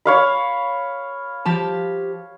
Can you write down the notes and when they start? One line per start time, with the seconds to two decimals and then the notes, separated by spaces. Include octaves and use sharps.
0.05 C#5 F5 B5
1.45 F3 G4 A5